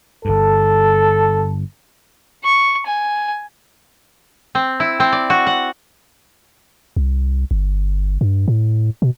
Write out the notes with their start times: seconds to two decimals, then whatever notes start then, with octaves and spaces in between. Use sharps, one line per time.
0.25 G1 G2 A4
2.44 C#6
2.87 G#5
4.55 C4
4.80 E4
5.00 C4
5.12 D5
5.30 F#4
5.47 F#5
6.96 C2
7.51 G1
8.21 G2
8.48 A2
9.02 B2